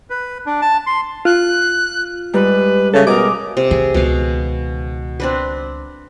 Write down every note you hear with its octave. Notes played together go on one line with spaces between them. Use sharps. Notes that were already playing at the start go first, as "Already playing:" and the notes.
B4
D4
A5
C6
F4 F#6
G#2 G3 B4
C#3 A4 E5
B2 G#4 A#4 D6
C3
D3 G#4
C#2 B2 D#3 F5
C4 D4 B4